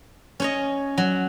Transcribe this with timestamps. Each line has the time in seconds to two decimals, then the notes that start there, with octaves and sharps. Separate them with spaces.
0.40 C#4 C#5 D#5
0.98 F#3